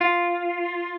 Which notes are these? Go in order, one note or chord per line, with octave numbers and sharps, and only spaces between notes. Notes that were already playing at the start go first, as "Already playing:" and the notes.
F4